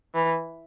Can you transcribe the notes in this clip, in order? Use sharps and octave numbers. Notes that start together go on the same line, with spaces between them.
E3